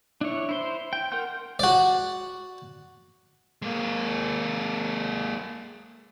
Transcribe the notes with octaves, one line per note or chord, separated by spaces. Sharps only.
D4 E4 C#5
E4 C5 C6
G5
A#4 F#5 G5 C6 G6
F#4 D5
G#3 A#3